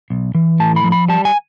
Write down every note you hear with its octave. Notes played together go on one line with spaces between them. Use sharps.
B1
E3
A2 A5
B5
F3
B5
G3 A5
G#5